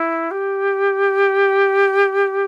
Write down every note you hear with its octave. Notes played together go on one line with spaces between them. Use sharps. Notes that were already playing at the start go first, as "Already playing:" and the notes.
Already playing: E4
G4